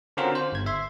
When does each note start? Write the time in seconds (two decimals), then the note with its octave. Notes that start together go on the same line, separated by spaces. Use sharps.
0.17 D3 C4 C#4 F4 F#4 A#4
0.35 C5
0.52 G1 G#6
0.66 E5 C6